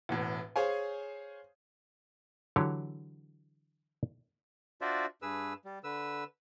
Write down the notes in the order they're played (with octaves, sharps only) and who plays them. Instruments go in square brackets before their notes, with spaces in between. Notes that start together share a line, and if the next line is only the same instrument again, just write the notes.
[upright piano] E1 E2 A2
G#4 C5 C#5 F5 G#5
[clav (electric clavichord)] D3 E3 F#3 G4 C#5
[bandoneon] D4 F4 F#4 C5 D5 E5
G2 G#4 B4 E6
G3
D3 B4 E6